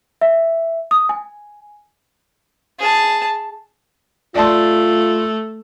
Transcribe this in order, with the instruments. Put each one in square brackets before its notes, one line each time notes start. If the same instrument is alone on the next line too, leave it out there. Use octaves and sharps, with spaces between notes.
[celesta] E5
D#6
G#5
[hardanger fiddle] G#4 A5
[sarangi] A3 [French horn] F4 [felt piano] D5 A5 C6